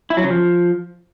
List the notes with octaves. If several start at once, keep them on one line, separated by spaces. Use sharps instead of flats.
E4
F#3
C#3
F3